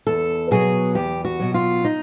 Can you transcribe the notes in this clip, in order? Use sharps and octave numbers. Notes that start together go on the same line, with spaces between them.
E2 A4
B2 F#3 G#4
E2 G4
F#4
B2 F#3
F4
D#4